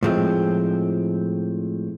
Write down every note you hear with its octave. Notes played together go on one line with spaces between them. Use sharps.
A2 F3 G#3 C4